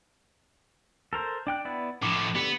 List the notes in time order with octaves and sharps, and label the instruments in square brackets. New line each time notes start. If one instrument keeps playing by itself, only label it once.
[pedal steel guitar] A4 A#4 C5
D4 G5 F#6
B3 E4 D5
[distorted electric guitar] A2 F3 [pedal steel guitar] D6
[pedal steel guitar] D3 G4 [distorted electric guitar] B3